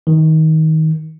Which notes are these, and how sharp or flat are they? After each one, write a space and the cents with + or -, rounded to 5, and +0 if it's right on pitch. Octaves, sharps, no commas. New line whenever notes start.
D#3 +25